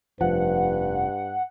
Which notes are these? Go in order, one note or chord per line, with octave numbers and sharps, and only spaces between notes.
F1 G2 F3 B4 F#5